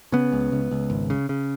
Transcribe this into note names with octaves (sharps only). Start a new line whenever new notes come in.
C#3 B3
C#2
C#2
C#2
G#1
C#3
C#3